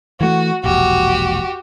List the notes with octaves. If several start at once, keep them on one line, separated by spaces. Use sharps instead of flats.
E3 A3 F#4
E1 A#1 F#4 G4